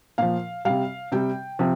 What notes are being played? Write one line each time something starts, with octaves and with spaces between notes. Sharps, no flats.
A#2 F3 F5
C3 G3 F5
C3 G3 G5
C3 F3